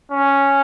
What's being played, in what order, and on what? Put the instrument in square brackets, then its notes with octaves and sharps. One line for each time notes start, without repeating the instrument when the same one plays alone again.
[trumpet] C#4